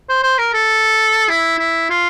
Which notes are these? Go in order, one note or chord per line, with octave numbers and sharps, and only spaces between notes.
C5
C5
A#4
A4
E4
E4
F4